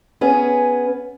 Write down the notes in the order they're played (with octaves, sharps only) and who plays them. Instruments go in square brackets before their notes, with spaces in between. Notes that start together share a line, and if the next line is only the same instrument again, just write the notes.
[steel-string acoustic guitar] B3 C#4 G#4